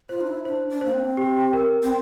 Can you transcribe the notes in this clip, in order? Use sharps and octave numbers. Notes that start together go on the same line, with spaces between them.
F4 C5
D4
E4
D4 C5
D4
A#3 C5
C4
G4
A#4
C4